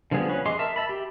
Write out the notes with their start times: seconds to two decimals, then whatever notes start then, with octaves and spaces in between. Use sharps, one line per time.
0.11 D3 F3 G3 B3 G#4
0.29 C#4 B4
0.46 G#4 D#5 C6 D6
0.59 A#4 E5 A5
0.76 E5 A5 B5
0.89 G4